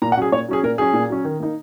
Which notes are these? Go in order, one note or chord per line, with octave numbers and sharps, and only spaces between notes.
A#2 A#5
F#5
F#3 C#4 G#4
A#2 C#5
F#3 C#4 G#4
A#2 A#4
F#3 C#4 G#4
A#2
F#3 C#4
D#3
A#3 D#4